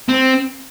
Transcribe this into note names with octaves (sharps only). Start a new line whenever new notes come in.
C4